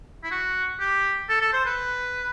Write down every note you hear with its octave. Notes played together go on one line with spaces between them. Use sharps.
E4
F#4
G4
A4
A4
C5
B4